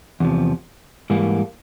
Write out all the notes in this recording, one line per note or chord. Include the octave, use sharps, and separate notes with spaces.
E2 C3 F3
G#2 E3 G3 A#3